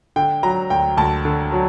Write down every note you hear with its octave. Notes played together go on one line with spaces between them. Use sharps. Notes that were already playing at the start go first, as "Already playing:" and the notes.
D3 G5
F#3 A#5
D2 G5
D2 A5
D3
F#3